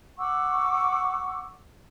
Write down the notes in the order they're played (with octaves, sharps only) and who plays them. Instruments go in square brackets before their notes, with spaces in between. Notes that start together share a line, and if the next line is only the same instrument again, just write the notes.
[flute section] F#5 C#6 D6 E6